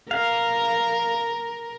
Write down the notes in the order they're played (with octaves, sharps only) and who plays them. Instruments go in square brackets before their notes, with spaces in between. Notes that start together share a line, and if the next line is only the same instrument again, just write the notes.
[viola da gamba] A#4 [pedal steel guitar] F5